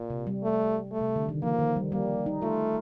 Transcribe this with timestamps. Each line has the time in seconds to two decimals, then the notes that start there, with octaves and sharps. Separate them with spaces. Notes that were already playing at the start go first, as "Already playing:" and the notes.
Already playing: A#2
0.10 C3
0.27 G3
0.43 A3
0.92 A3
1.01 C3
1.16 D3
1.29 D#3
1.43 F3 A#3
1.59 D#3
1.76 G3
1.92 G3 A#3
2.26 D#4
2.42 A3 F4